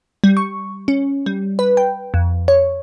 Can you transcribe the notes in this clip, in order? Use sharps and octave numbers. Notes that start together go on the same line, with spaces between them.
G3
C#6
C#4
G3
B4
G5
F2
C#5